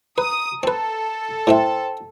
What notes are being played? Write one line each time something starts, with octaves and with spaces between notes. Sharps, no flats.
B4 A#5 D#6
C4 A4 B4
A2 C4 C5 E5 G5 C6